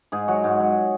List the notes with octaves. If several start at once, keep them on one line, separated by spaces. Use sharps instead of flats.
G#2 G#4
F#3 F#4
G#2
F#3